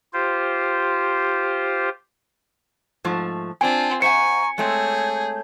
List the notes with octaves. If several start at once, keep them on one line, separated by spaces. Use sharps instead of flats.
F4 G4 C5
G#2 F3 A3
C4 D4 F4 G5 G#5
C5 E5 F#5 G#5 A#5 C#6 C#7
G#3 A3 C4 G#4 C#5 G6